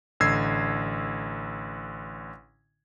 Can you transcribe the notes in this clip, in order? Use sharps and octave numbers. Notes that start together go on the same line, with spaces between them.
A1 D3 E6 G#6 C7